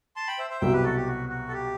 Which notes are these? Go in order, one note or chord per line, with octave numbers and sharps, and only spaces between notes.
A5 C6
G5 B5
C5 E5
C5 E5
C2 B2 F#3 E5 G5
G4 B4
F#4 A4
G4
F#4
F#4
A4
G4